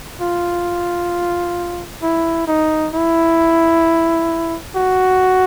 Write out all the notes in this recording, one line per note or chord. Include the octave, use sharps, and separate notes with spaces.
F4
E4
D#4
E4
F#4